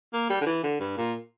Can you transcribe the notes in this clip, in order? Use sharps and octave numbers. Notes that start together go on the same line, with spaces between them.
A#3
G3
D3
E3
D3
G2
A#2